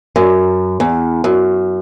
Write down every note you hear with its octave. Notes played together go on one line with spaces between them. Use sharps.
F#2
E2
F#2